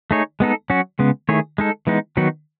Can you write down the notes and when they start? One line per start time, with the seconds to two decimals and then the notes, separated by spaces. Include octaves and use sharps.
0.11 A3 D#4 G#4 C#5
0.40 G#3 B3 D#4 A4
0.70 F#3 C#4 F#4
0.99 C#3 G#3 B3
1.29 D#3 A3 E4 G#4 C#5
1.58 G#3 D#4 A4
1.87 E3 G#3 B3 D#4
2.17 D#3 F#3 B3 D#4 F#4